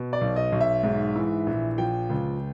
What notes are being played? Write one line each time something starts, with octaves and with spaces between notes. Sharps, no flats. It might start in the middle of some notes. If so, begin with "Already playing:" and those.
Already playing: B2
D5
B1
D#5
B1
E5
G#2
E3
A#1
F3 G5
C#2